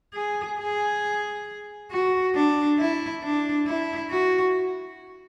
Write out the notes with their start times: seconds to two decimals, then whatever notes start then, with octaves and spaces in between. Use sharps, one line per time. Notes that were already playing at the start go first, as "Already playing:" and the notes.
0.14 G#4
0.58 G#4
1.91 F#4
2.35 D4
2.79 E4
3.23 D4
3.67 E4
4.10 F#4